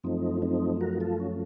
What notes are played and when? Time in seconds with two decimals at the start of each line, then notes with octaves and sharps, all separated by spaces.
0.04 F#2 F3 A3 C4 D#4
0.42 C4 D#4
0.81 F#4 A#4
1.00 F4 A4
1.20 C#4